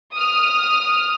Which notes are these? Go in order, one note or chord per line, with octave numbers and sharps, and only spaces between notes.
D#6 F6